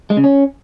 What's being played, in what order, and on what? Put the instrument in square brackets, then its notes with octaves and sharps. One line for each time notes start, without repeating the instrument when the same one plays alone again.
[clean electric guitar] G#3
C#3
C#4